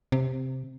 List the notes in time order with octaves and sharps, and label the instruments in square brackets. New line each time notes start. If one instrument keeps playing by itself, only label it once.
[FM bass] C3